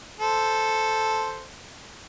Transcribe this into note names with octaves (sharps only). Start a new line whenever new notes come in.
A4 C5